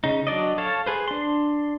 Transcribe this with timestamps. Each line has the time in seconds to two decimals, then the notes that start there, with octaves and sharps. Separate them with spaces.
0.04 C#3 D#4
0.27 F#3 D4 D5 D#5
0.58 A4 C#5 F5 A5
0.86 G#4 B4 C5
1.08 D4 C6